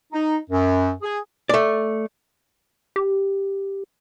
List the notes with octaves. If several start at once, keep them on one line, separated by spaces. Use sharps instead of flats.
D#4
F#2
G#4
A3 D5
G4